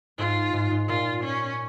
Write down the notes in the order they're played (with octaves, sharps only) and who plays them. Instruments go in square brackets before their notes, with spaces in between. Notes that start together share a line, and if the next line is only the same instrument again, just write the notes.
[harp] G#2 [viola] F4
[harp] G#2
G#2
[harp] A#2 [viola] F4
[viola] C#4